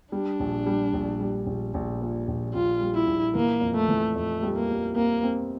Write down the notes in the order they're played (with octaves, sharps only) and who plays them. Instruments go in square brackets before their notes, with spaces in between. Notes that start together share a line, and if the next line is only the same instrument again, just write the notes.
[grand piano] G3 [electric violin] D4
[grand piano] A#1
G3
A#1
G3
A#1
A#1
A#2
A#1
[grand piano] A#1 [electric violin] F4
[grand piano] G3
[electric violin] E4
[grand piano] A#1
[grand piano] E3 [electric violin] A#3
[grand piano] F2
[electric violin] A3
[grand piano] E3
[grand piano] F2 [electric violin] A3
[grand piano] G3
[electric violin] A#3
[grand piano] G3
[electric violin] A#3 [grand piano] C4
[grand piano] C4